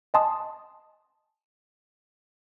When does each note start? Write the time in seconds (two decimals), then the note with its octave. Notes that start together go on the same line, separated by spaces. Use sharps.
0.14 D#5 G#5 A5 C6 D#6